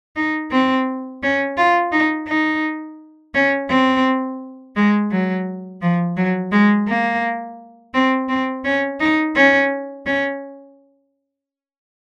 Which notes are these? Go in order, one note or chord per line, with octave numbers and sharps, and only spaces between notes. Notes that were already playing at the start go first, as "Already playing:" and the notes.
D#4
C4
C#4
F4
D#4
D#4
C#4
C4
G#3
F#3
F3
F#3
G#3
A#3
C4
C4
C#4
D#4
C#4
C#4